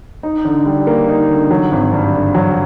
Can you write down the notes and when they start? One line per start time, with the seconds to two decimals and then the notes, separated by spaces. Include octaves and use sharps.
0.23 D#4
0.45 D3
0.66 G3
0.87 A#3
1.08 D#4
1.30 D3
1.50 F#3
1.71 G#1
1.92 G2
2.14 D3
2.35 F#3